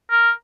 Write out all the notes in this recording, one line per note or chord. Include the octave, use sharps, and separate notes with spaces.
A#4